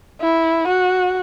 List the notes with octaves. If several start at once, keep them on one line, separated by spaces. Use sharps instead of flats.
E4
F#4